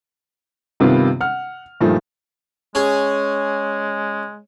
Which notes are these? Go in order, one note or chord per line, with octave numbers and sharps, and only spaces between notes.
G2 C3 D#3 B3 C4 F4
F#5 F6
G2 A#2 D#3 F3 A3
G#3 C#4 G#4